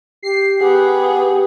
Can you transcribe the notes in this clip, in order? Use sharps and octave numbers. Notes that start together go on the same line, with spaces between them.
G4 C7
B3 G4 G#4 F#5